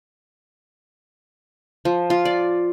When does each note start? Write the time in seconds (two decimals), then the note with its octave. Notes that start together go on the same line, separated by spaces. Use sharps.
1.85 F3
2.10 F4
2.25 D5